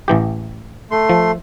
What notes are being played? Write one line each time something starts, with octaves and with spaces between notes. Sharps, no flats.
A1 E3 G4
A3 C6
F3